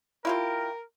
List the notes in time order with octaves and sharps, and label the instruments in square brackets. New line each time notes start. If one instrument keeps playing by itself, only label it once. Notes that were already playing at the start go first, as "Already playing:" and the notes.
[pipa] E4 F4 G4 [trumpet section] A#4